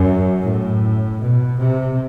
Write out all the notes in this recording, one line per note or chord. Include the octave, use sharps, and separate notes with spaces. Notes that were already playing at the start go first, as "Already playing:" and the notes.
Already playing: F#2
A2
B2
C3